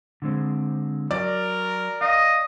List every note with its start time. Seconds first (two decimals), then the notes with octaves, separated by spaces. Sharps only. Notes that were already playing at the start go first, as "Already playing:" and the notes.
0.22 D3 G#3 C4
1.11 F#3 A#4 D5
2.01 D#5 F5